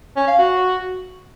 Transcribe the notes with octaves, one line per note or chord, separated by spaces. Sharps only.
C#4
F5
F#4